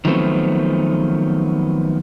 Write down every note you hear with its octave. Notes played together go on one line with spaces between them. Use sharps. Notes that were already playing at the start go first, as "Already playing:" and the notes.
D#3 F3 F#3 A3 B3 C4